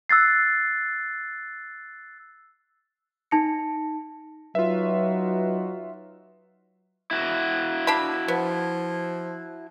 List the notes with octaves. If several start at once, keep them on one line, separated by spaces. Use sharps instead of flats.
E6 F#6 A6 C7
D#4 A5 A#6 C#7
F#3 D#4 F4 F#4 B4 E5
E4 F#4
D4 B5
F3 B3